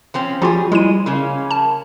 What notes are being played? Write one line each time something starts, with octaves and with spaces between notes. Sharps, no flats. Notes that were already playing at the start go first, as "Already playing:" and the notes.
F3 C4 C#4
F3 G3 F4 F#4 G#4
G3 G#3 E4 D#7
C#3 A#3 C#4
A5